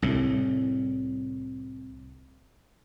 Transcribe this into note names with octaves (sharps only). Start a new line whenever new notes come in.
C2 A2